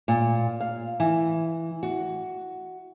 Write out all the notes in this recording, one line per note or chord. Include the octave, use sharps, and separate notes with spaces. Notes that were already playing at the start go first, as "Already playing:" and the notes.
A#2
F5
E3
F#4